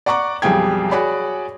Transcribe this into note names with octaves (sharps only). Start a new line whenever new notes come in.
D5 F#5 A#5 C#6 D6
B1 F2 G3 G#4 G5 G#6
F#4 G#4 C#5 D5 B5